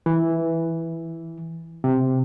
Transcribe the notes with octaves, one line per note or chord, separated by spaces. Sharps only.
E3
C3